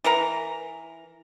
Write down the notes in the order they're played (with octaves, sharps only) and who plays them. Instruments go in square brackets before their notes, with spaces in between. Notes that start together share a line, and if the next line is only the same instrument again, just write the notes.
[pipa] E3 A#4 A#5